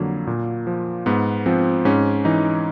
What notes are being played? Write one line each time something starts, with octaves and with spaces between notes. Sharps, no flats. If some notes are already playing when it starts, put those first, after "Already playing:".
Already playing: F2 D3 F#3 A#3
A#2
F3
G#2 B3
F3 C4
G#2 C#4
E3 D#4